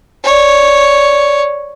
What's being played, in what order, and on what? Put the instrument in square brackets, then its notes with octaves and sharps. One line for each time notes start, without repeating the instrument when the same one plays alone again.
[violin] C#5 D5